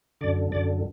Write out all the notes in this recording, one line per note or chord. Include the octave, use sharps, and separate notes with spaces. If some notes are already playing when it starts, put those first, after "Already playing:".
F#2 D3 D5
F#2 D3 D5